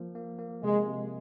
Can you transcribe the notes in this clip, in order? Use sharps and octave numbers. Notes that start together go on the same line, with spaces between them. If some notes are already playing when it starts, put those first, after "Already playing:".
Already playing: F3 A#3
A#3
A#3
C3 G#3
C3